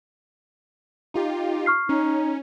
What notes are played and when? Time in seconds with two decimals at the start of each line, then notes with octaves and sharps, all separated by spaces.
1.14 D#4 F4 G4
1.66 C#6 F6 C7
1.89 C#4 D#4